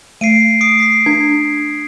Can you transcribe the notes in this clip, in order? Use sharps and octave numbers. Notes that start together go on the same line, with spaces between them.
A3 C7 D7 D#7
D#6 C7 D7
B6 C7
D4 G#6